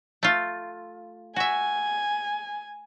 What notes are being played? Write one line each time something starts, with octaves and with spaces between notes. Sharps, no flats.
A3 F4
F#4 E5 G#5